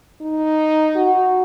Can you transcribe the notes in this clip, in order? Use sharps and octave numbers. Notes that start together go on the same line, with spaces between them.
D#4
F#4